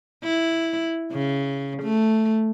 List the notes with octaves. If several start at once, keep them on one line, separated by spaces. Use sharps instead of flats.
E4
C#3
A3